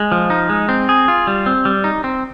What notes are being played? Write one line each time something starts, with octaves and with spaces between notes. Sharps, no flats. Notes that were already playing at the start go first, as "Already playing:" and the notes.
Already playing: G#3
F3
D#4
G#3
C4
G#4
F4
G3
C4
G3
D#4
C4